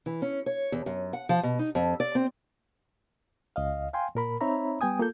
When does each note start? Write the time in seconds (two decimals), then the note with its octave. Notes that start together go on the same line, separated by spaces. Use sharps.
0.06 E3
0.22 C#4
0.46 C#5
0.72 E2
0.86 F#2
1.13 F#5
1.29 F3
1.43 B2
1.59 D#4
1.75 F2
2.00 D5
2.15 C4
3.56 C#2 D#5 F5
3.93 F5 G5 G#5 C6
4.15 A#2 A#4 B5
4.41 C4 D#4 C#5 E5 A#5 B5
4.81 G3 B3 G5 G#5 D#6
4.99 A#3 F4 A4 G6